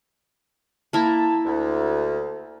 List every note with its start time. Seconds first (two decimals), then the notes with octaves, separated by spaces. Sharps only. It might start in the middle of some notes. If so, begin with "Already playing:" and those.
0.93 A#3 E4 A5
1.45 D2